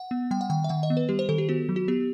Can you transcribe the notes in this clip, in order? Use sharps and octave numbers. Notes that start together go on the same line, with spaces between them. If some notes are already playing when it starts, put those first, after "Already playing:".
Already playing: F#5
B3
G3 G5
F#5
D#3 G5
E5
D#3 F#5
D#5
B3
B4
G3 G4
C5
D#3 A4
G4
B3 F#4
F#3
F#4
B3 G4